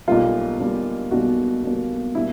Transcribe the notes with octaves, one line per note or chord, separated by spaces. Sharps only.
B1 B2 G3 A#3 F4
B1 B2 G3 A#3
B1 B2 G3 A#3 F#4
B1 B2 G3 A#3
B2 G3 A#3 E4